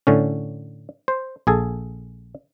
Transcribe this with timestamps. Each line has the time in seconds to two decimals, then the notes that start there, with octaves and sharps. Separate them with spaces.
0.07 A2 D3 C#4
1.08 C5
1.47 A#1 G#4 A4